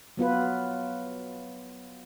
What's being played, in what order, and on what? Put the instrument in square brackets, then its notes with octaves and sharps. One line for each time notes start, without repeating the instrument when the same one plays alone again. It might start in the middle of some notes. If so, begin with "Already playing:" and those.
[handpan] F#3 B3 F4 B4